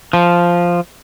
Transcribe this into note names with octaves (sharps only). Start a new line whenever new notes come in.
F3